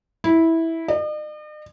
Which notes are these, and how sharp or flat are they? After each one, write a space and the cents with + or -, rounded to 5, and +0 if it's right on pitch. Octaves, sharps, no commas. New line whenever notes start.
E4 -10
D#5 -45